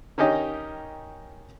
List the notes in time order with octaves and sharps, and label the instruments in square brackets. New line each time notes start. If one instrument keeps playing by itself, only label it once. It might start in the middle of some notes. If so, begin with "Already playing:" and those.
[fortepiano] D#3 C#4 D#4 G4 D#5